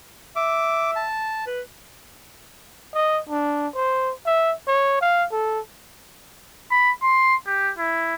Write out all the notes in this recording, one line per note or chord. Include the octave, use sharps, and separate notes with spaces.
E5 D6
A5
B4
D#5
D4
C5
E5
C#5
F5
A4
B5
C6
G4
E4